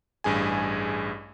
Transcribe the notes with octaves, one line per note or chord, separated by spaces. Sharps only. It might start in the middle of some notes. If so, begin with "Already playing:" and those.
A1 G2 G#4 G#5